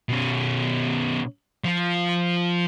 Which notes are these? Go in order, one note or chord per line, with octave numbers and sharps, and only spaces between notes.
B2 C#4
F3 F4